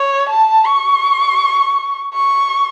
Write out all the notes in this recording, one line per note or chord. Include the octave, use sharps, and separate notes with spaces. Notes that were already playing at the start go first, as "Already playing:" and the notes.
Already playing: C#5
A5
C#6
C#6